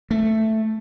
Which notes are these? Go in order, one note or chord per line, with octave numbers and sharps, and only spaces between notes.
A3